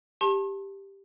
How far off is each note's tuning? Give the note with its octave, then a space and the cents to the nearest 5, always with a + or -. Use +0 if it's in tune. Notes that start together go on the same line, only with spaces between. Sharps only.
G4 +5 A5 +0 C6 +45